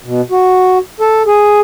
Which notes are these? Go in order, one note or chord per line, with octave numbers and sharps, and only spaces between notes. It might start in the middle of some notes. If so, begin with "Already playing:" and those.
B2
F#4
A4
G#4